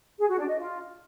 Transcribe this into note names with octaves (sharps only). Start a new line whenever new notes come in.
G#4
F#4
D4
D#5
F4